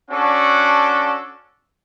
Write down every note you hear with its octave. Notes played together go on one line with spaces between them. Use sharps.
C#4 D4 F#4 A4 F#5 D6